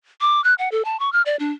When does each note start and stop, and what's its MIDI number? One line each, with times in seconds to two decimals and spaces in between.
0.21 0.43 86
0.44 0.54 90
0.59 0.69 78
0.72 0.82 69
0.85 0.99 81
1.00 1.12 85
1.13 1.22 89
1.26 1.36 74
1.40 1.52 62